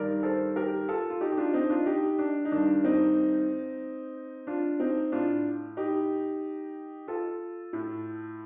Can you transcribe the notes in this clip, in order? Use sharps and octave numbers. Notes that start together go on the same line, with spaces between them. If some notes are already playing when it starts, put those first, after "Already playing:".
Already playing: G2 D#3 A#4 D5
A4 C5
G4 A#4
F4 A4
F4
D#4 G4
G4
D4 F4
C4 D#4
D4 F4
D#4 G4
D4
D#4
G2 D#3 D4
C4 D#4
D4 F4
C4 D#4
A2 D4 F4
D#4 G4
F4 A4
A2